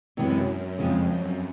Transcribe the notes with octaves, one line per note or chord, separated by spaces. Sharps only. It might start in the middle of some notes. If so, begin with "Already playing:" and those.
F#2 C3 E3 G#3 B3 E4
F#2
F2 C#3 F3 G#3 C4 F4
F#2